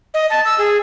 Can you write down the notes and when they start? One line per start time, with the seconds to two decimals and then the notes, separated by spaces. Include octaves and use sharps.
0.14 D#5
0.30 A5
0.45 E6
0.58 G#4